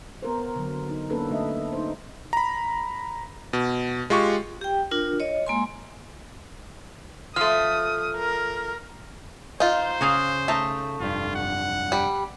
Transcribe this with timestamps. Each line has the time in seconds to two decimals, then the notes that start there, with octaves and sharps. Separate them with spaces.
0.23 B3 A#4 C5
0.56 D3 F#3
0.89 D#4
1.10 A#3 C#4 D4 A4 B4
1.30 D3 A3 D4 D#5 E5
1.73 D#4 C5
2.33 A#5 B5
3.53 B2
4.10 G#3 F4 G4 C#6
4.61 G4 G5
4.91 D4 F4 A#4
5.20 C#5 D#5
5.47 G#3 A#3 G#5 C6
7.36 F3 A3 D#6 F6
8.17 A#4
9.60 D#4 F4 C5
10.01 C#3 F#4 G#4 F5
10.48 A3 D#4 A5 A#5
11.00 F1 G2 F4
11.35 F#5
11.92 G3